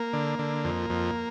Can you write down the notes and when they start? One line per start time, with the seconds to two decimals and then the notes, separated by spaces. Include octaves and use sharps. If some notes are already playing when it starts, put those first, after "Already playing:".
Already playing: A#3
0.13 D3
0.39 D3
0.64 F2
0.90 F2